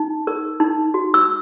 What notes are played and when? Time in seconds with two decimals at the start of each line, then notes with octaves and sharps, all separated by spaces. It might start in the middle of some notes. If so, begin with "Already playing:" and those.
Already playing: D#4
0.27 A#4
0.60 D#4
0.94 F#4
1.14 E6